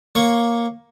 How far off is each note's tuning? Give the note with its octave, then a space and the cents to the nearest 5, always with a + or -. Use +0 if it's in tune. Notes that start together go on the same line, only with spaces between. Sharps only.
A#3 +5 C#5 -10 C#6 +0